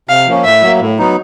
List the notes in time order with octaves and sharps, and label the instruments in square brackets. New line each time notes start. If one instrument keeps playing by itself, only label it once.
[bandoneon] C3 [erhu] F5
[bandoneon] F3 A#3 C#4
[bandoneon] A2 [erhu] E5
[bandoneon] F#3 A#3
A2
F#3 B3 D#4